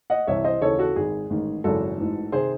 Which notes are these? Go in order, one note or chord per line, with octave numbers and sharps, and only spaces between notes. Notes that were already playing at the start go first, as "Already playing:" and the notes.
D#5 F#5
C2 C3 E3 C#5 E5
C5 D#5
D#2 C#3 E3 A4 C#5
F#4 A4
G#1 G#2 D#3 G#4
A1 G#2 D#3
G#1 F#2 C#3 E3 F#4 A4
A1 G#2 E3
C3 D#3 G#4 C5